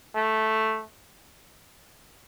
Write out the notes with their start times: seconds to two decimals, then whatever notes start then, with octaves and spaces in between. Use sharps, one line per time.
0.15 A3